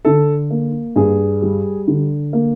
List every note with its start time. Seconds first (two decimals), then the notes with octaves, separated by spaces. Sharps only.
0.05 D3 A4
0.51 A#3
0.96 G2 G#4
1.42 G3
1.88 D3
2.33 A#3